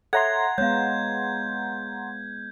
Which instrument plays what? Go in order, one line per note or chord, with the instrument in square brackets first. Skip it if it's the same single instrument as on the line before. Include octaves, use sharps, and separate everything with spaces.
[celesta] A4 C#5 E5 [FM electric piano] F#5 A#5 C6 [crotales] G#6
[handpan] G#3 B3 [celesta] C#5 F5 [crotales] G6